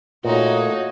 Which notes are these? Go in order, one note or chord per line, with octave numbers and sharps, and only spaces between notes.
A#2 A3 D#4 F4 F#4 C#5